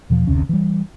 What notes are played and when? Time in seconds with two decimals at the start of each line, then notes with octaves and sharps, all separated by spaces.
0.10 E2 B2 F3
0.27 F#1 D2 C3 C#4
0.49 E3 G3